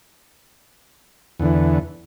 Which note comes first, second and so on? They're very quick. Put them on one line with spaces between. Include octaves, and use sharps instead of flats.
E2 D3 E3